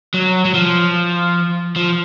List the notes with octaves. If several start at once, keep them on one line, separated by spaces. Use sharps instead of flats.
F#3
F#3
F3
F3